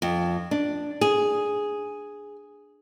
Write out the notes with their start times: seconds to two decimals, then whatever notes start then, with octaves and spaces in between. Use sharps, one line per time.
0.02 F2
0.51 D4
1.01 G#4